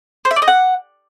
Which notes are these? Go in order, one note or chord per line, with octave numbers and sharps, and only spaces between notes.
C5
E5
D5
D#5
F#5